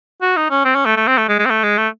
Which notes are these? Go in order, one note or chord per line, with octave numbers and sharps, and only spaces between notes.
F#4
D#4
C#4
C4
C#4
A3
A3
C4
A3
G#3
G#3
C4
A3
G#3
A3